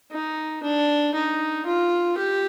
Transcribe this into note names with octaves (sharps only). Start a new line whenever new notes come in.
D#4
D4
D#4
F4
G4